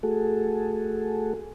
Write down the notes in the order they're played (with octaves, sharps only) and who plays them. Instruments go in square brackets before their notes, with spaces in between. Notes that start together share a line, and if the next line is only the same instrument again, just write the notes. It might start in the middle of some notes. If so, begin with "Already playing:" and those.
[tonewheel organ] A3 F#4 G#4 A4